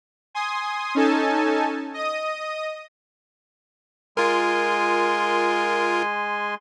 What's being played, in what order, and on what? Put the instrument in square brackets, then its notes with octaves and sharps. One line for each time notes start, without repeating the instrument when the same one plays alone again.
[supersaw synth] G#5 C6 D#6
C#4 D#4 A4 G#5 A5
D#5 D#6
[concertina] G#3 G#5 C6 [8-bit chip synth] F4 A#4